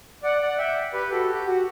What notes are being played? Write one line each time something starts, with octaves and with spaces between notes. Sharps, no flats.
D5 F#5
D5 F#5
E5 G5
G4 B4
F#4 A4
G4
F#4